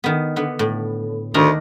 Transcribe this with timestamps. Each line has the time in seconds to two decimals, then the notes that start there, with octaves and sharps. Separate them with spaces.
0.04 D#3 B3
0.36 D3 B3
0.59 A2
1.34 D2 D#3 D4 A#5